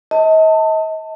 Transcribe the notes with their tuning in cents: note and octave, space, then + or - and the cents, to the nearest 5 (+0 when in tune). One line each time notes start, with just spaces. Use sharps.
D#5 +40 A5 +20